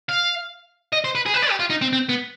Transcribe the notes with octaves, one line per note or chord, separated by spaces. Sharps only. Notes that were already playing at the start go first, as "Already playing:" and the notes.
F5
D#5
C5
B4
G#4
B4
D5
G4
F4
D#4
C4
C4
B3